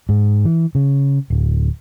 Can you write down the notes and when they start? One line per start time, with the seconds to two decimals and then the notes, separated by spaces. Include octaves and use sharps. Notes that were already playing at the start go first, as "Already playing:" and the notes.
0.09 G#2
0.45 E3
0.75 C#3
1.30 D1